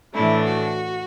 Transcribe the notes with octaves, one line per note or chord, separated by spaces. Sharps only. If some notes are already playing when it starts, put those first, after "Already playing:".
A2 E3 A3 D4 E4
F#4